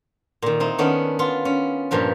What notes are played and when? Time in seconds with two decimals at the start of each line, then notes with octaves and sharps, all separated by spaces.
0.42 A#2 D#3
0.60 C4 D#4 E4
0.78 D#3 B3 C#4 D4
1.19 B3 F4
1.45 C#4
1.91 G2 A#2 F3 B4